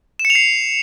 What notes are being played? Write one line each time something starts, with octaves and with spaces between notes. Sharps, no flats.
E7
C#7
F7
C7